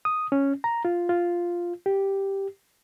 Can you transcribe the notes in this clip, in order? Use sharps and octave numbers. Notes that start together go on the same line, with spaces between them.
D#6
C#4
A#5
F4
F4
G4